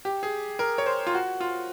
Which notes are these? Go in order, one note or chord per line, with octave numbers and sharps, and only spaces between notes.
G4
G#4
A#4
C#5
C5
F4
F#4
F4